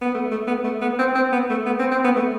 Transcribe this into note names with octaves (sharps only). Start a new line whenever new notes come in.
B3
A3
A3
B3
A3
B3
C4
C4
B3
A3
B3
C4
C4
B3
A3